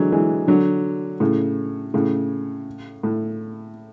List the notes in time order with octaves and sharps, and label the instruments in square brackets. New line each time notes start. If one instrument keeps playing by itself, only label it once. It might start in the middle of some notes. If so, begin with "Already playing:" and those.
Already playing: [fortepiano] D3 E3 F#3 G#3
E3 G#3
D3 F#3
A2 C#3
A2 C#3
A2